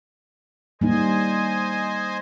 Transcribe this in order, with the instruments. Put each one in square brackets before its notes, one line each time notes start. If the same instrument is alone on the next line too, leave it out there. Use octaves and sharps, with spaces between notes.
[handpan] G3 A#3 D#4 [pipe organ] C5 D#5 G#5